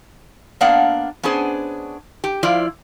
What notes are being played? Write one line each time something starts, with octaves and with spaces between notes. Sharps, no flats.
A#3 B3 D4 D5 F5 F#5
B3 C#4 D4 G#4 C5
G4
F3 E4 F4 C5 D5